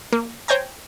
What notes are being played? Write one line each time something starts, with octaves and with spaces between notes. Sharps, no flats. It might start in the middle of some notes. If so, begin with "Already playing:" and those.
A#3
C5 C#5 G5 G#5 A#5